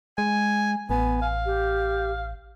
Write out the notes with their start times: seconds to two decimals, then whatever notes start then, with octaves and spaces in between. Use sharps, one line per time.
0.18 G#3 G#5
0.90 A1 B3 G#5
1.22 F5
1.46 G4